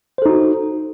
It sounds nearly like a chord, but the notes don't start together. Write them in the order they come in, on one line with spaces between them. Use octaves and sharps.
C5 A4 D#4 F#4